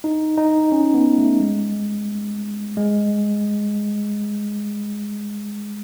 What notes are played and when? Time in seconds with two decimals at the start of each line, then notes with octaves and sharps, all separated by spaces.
0.04 D#4
0.37 D#4
0.72 C#4
0.94 B3
1.18 A3
1.40 G#3
2.77 G#3